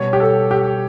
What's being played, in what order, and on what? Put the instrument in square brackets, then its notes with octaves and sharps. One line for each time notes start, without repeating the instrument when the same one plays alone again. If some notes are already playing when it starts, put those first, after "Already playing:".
Already playing: [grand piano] B2 G3 C#5
G4
A4
G4